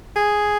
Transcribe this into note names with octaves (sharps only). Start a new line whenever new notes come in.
G#4